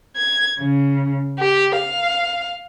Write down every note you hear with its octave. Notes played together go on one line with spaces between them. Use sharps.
G#6
C#3
G4
F5